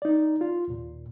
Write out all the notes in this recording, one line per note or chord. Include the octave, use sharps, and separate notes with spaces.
D#4 D5
F4
D#2 A#2